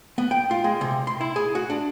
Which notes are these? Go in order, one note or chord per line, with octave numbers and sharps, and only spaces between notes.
B3
G5
F4
G#3
C3
C6
E4
G#4
F#4
D4